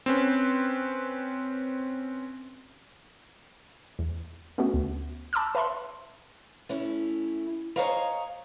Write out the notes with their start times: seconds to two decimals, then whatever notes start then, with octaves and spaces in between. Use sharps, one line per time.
0.06 C4 C#4 B4
3.99 E2
4.58 A3 B3 C#4 F#4
4.74 D2
5.33 A5 B5 D6 E6 F6
5.55 B4 E5 A5 B5 C6
6.69 A3 C#4 E4
7.76 G#4 C5 C#5 D#5 F5 A#5